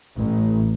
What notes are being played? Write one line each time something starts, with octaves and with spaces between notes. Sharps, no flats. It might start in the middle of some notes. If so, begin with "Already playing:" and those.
A1